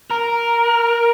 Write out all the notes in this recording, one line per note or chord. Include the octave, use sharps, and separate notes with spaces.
A#4